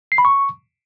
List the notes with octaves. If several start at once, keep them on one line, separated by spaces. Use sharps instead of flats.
C7
B5
C#6